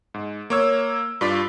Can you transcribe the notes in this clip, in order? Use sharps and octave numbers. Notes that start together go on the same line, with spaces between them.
G#2
A#3 C#5 E6
G2 F4 D5 B6